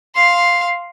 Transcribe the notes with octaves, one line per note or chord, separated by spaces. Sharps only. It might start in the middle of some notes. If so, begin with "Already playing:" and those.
F5 C6